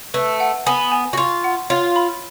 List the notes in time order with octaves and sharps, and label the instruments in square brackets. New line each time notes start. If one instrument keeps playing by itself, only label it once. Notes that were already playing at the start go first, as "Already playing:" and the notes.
[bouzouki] A3 [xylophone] B4
[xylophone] F#5
[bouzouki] B3 [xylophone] G#5
[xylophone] G#5
[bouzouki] F#4
[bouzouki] F4 [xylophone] C#6
[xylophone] F#5
[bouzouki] F4 [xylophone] C#5
[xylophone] B5